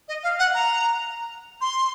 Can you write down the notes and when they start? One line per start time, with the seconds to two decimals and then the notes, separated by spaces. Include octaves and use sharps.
0.08 D#5
0.23 F5
0.39 F#5
0.54 A#5
1.61 C6